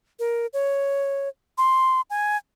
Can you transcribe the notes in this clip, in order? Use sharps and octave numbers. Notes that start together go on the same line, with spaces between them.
A#4
C#5
C6
G#5